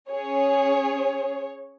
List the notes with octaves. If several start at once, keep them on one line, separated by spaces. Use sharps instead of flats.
C#4 G#4 C#5